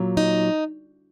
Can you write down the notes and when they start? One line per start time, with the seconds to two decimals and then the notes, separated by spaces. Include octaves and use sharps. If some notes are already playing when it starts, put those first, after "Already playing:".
Already playing: A#2 F#3
0.17 D#4